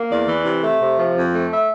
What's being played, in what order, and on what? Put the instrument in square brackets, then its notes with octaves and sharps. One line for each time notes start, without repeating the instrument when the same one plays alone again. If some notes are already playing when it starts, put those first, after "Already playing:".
Already playing: [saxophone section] A#3
E2 D5
E3
C3
A3
C3
F3
F2
A3
E5